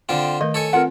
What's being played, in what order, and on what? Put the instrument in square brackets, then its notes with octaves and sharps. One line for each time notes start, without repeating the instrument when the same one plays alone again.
[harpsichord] D3 C4 F4 [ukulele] G5
[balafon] D#3 A3 A#4 [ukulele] D#5
[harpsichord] A4 C#5 G#5
[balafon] C4 F4 B4 [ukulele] A#4 F#5